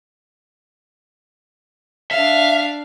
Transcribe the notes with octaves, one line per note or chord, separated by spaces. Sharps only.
D4 E5 F5